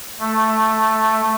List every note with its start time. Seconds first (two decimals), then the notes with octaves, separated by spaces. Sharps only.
0.20 A3